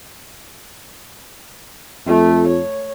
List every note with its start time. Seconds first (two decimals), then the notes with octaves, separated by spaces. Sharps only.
2.07 F2 A3
2.47 C#5